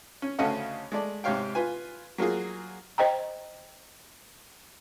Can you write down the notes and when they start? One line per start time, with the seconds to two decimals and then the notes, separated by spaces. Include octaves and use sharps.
0.22 C#4
0.39 D2 C#3 A3 C#4 D#5 F#5
0.92 G#3 A3 D5
1.24 G#2 C3 G4 C#5 F5 G5
1.55 F4 B4 G#5
2.18 F#3 A#3 F4 G#4
2.98 C5 D#5 G5 A#5